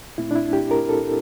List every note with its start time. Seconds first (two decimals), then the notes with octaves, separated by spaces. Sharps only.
0.18 A#2 A3 C4 E4
0.31 D4
0.35 E4
0.53 G4
0.71 A#4
0.89 A4